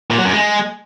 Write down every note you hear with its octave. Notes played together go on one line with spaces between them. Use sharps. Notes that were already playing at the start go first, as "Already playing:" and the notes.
A#2
F#3
F#2
G#3